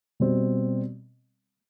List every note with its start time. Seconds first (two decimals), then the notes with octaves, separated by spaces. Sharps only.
0.20 B2 G3 C4